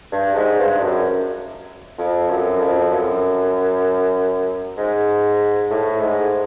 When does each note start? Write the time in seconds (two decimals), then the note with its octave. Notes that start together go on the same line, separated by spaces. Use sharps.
0.12 G2
0.35 G#2
0.59 G2
0.82 F#2
1.98 F2
2.29 F#2
2.59 F2
2.92 F#2
4.77 G#2
5.70 A2
6.01 G#2